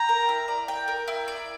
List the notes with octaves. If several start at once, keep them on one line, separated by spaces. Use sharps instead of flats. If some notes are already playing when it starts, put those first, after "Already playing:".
Already playing: G5 A#5
A#4
E4
D5
G5
A#4
E4
D5